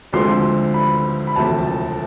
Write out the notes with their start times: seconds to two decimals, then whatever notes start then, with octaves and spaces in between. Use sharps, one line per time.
0.13 D2 D3 F3 G#3 C4 C6
0.74 B5
1.27 B5
1.36 E1 D2 C3 F3 A3 A5
1.67 A5